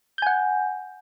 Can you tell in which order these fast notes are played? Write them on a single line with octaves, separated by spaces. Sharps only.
G6 G#5 F#5